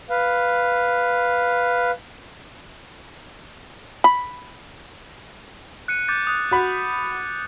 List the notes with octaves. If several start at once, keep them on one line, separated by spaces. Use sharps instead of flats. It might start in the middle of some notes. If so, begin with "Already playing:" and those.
B4 F5
B5
F#6 C#7 D#7
D6 G6 A6
D#6 F#6
F#4 B5